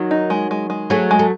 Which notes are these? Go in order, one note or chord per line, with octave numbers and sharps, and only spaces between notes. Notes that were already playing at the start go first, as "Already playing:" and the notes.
Already playing: D#3 F#3
D#4
G#3
G#3
G#3
F#3 A3 G#4
G#3
A3